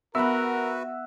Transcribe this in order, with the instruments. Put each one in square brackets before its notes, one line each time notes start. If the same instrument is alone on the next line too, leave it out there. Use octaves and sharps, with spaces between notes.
[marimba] B3 B5 [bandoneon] F#4 B4 [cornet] A#4 [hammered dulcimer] E5 F#5